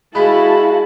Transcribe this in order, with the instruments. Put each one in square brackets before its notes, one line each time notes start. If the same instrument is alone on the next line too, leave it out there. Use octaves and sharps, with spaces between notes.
[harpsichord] G#3 [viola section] E4 F#4 A5 [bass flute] F5 [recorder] B5